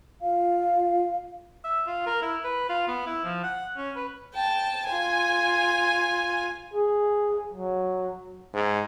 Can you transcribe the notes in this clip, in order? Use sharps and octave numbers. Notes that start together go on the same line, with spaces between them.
F4 F5
E5
F4
A#4
E4
B4
F4
B3
E4
F3
F#5
C#4
B4
G5 A5
F4 G#5
G#4
F#3
G#2